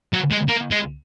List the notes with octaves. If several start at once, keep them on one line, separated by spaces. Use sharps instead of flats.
F#3
G#3
A#3
G#3